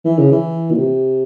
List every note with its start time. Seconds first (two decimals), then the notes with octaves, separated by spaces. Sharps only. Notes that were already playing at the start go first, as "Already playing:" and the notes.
0.05 E3
0.19 C#3
0.32 E3
0.71 A#2
0.77 C3